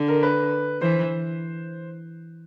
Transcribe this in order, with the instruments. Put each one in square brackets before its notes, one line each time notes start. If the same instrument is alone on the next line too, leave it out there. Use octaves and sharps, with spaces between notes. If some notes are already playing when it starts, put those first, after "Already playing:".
Already playing: [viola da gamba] D3
[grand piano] A#4
B4
[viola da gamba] E3 [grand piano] C5